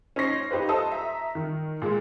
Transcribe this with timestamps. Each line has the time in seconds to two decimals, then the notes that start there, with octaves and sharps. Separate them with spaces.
0.16 C#4 D#4 C5 C#6 A#6 C7
0.51 D#4 G4 B4 C5
0.69 A4 C5 D#5 A5 D#6 E6
0.92 E5 A#5
1.35 D#3
1.82 A#2 G#3